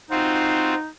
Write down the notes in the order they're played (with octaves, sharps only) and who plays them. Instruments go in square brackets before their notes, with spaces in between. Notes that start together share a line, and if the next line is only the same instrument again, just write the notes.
[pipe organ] C4 F4 F#4 [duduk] D#4